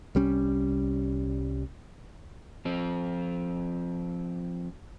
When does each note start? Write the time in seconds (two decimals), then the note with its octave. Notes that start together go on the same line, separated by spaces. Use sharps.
0.15 C2 G3 C#4
2.65 F3 C4